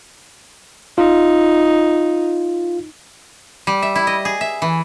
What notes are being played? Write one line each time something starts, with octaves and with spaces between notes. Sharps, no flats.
D#4 F4
G3
E5
E4
D#5
G#4
E5
E3